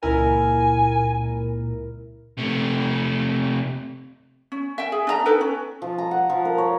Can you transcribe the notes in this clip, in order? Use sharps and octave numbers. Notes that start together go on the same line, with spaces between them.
C#2 A#2 E4 A#4 G#5
C3 A3
C#4
E5 G5
G#4
D4 E5 A#5
D#4 A4 B4 G5
C#4
F3
A#5
F#5
F3
A#4
C#5